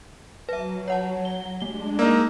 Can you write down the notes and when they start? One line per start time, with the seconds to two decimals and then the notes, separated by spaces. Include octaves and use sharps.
0.49 F#3 B4 E5
0.88 C#5 F#5 A5
1.25 G7
1.61 G#3 A3 D4 G7
1.99 A#3 D#4 D5 E6